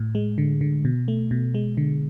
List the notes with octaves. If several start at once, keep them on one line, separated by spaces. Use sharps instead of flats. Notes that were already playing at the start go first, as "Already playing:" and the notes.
Already playing: A2
G#3
D3
D3
B2
A3
B2
G#3
D3